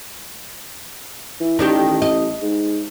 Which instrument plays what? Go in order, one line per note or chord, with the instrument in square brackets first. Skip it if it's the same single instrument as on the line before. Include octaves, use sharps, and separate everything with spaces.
[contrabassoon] E3
[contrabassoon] A1 [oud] D#3 D4 G4
[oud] D#5
[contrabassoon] G#2